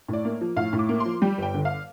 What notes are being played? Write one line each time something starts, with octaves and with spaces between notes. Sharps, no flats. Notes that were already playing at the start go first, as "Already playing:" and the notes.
A2 D5
A#3
F3
A2 F5
A2
D6
A#3
C6
F3
G3 G5
G1 G5
D3
F5